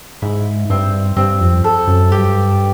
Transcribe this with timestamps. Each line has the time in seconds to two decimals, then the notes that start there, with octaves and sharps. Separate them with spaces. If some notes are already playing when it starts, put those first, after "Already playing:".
0.22 G#2 E4
0.70 G2 C4
1.17 G2 C4
1.40 F2
1.64 A4
1.88 F#2
2.11 G2 G4